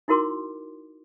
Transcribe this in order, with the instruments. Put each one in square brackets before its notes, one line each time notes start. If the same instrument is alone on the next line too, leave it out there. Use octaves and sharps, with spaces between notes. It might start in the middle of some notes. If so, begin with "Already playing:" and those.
[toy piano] D#4 E4 F#4 A#4 C6 D6